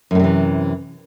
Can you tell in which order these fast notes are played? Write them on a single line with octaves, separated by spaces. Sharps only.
F#2 A2 C3 E3